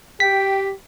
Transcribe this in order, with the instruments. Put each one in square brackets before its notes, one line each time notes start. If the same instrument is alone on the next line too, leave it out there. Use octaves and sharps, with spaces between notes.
[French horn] G4 [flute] G5 [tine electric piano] B6